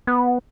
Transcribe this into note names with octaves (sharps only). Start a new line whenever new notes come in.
B3